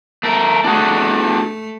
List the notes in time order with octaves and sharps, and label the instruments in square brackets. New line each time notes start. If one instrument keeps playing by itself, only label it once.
[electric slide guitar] A3 A#4
[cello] A3 [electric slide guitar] D4 F#4 G#4